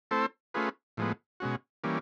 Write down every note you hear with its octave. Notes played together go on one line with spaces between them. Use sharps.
A3 C4 E4 A4 C5
A3 C#4 F4 G#4 B4
A2 F3 G#3 B3
B2 G#3 C#4 F#4
E3 G3 A#3 C#4